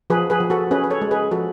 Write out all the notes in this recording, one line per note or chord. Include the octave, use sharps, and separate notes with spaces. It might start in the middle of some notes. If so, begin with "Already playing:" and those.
F3 G#4 B4
G#4 B4
F3
F#4 A4
C#4 G#4 B4
B4
A4 C#5
G#3
G#4 B4
F3 F#4 A4